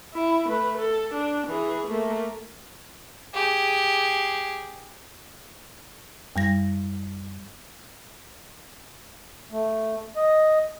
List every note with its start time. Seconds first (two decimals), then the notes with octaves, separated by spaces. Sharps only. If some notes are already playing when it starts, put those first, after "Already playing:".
0.14 E4
0.49 A3 B4
0.77 A4
1.14 D4
1.47 E3 G#4
1.87 A3 A#3
3.34 G4 G#4
6.36 F#2 G3 A#6
9.52 A3
10.16 D#5